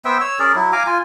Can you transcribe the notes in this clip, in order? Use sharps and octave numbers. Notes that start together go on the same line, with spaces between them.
B3 C5 E5 G5
C#5 E6
C#4 G#4 A#4 D5
F#3 E4
F5 G#5 A#5 D6
F4 G#5